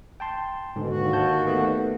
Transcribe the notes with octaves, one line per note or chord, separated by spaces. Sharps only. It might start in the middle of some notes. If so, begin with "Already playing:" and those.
G5 A5 C6
G#2 B2 D3
D#2 F#4
A5 G6
A3 B3